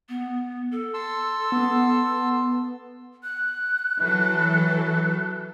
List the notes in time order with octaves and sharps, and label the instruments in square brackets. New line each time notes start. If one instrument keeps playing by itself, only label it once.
[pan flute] B3
A4
[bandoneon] A5 C6 E6
[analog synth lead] B3
[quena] F#6
[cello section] E3 F#3 A4